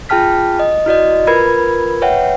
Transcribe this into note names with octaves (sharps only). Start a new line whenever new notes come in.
F4 G#4 G5 A5 F6 B6
D#5
E4 F#4 D5 D#5
F4 A#4 B4 B5 G#6
B4 C#5 E5 F#5 G5